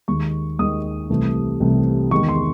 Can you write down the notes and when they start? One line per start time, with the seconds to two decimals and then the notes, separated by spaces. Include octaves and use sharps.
0.08 D#2 D#3 G#3 C#6
0.59 D#2 D#3 G#3 D#6
1.10 C2 C3 E3 A3
1.60 C2 C3 E3 A3
2.11 E2 D#3 G#3 C#6
2.29 C6